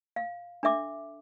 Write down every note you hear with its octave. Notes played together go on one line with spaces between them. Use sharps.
F5
D4 A4 E5 D6